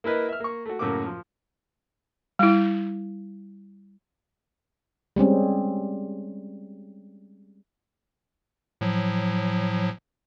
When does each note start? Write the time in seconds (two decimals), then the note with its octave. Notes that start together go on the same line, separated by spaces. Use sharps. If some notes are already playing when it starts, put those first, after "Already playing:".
0.04 A#3 E4 A#4 B4 D#5
0.29 E5 F6
0.40 A#3 C#6
0.66 A3 F#4
0.79 F#2 A2 C#3 A#3 F#4 D6
1.06 F3
2.39 G3 E4
5.16 G3 G#3 C4 C#4
8.81 A2 F3 F#3